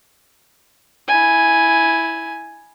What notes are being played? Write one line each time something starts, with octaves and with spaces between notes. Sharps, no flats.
E4 G#5